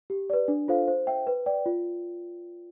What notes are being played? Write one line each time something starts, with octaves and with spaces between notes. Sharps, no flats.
G4
B4 D5
D4
F4 A4 C5 F5
C5
E5 G5
B4
D5 G5
F4